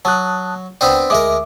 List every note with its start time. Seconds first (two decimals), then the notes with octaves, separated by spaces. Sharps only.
0.05 F#3 A5 D#6 F#6
0.81 C#2 B3 C4 D4 G5
1.10 D2 G#3 A#4 E5 D6